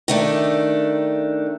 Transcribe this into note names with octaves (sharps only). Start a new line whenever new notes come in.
D#3 A3 D4